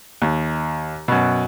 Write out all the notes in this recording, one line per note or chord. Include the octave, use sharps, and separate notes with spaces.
D#2
F#2 B2